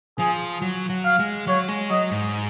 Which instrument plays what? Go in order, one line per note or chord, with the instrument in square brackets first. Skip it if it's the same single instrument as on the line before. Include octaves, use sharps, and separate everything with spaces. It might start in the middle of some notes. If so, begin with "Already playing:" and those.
[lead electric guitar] F3 [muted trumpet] G#4
[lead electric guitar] F#3
F#3
[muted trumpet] F5
[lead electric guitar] G#3
[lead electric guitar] F#3 [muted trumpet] C#5
[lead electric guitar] G#3
[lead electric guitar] F#3 [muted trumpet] D#5
[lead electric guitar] G#2